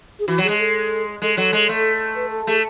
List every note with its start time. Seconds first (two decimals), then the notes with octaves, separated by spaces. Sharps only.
0.19 G#4
0.28 E3 F#4
0.38 F#3
0.43 G#4
0.49 G#3
0.59 A4
1.22 G#3 A4
1.37 F#3 A4
1.53 G#3
1.69 A3
2.15 B4
2.31 A4
2.47 A3 G#4